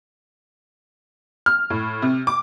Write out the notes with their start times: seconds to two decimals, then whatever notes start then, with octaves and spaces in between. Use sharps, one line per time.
1.46 F6
1.70 A2
2.02 C3
2.27 D6